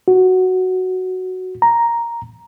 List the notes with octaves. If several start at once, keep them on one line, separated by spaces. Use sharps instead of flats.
F#4
A#5